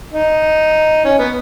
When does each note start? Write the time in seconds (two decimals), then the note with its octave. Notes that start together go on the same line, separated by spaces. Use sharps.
0.12 D#4
1.05 C#4
1.19 B3